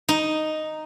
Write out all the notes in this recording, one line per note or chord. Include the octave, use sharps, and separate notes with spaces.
D#4